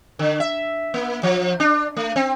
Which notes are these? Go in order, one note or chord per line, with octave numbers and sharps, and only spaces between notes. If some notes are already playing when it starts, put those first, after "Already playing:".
D3
E5
A#3
F3
D4
A3
C4